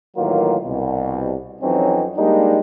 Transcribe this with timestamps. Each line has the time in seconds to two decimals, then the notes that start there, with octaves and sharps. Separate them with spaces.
0.16 A2 D#3 E3 F#3 A#3 F4
0.65 C2 B2
1.62 F2 E3 F#3 C4 C#4 D#4
2.16 G3 G#3 A#3 D4 D#4